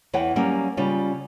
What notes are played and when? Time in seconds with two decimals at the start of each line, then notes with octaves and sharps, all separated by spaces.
0.13 E2 E3 C#5 F#5 G5
0.36 F#3 G3 A#3 C#4
0.77 C#3 G3 C#4 F4